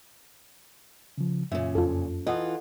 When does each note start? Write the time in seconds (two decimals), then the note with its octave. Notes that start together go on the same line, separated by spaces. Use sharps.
1.18 C#3 F3
1.52 F#2 A#2 C#3 C#4 E5
1.75 F2 F4 A4
2.27 E3 F4 A4 D#5 F#5